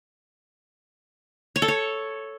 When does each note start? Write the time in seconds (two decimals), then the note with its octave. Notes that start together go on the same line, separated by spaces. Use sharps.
1.56 C#5
1.62 A4
1.68 C#5